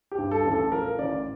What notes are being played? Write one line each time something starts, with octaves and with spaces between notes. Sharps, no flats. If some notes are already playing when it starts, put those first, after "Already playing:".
G4
G2
A4
A1
A4
F3 A#4
A1 D5